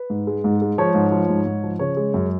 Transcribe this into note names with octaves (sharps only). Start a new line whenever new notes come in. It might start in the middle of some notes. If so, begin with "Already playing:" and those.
Already playing: B4
G#2
G#3
G#2
G#3
F3 C#5
G#2
F3
G#2
G#2
F3
C#3 C#5
G#3
F#2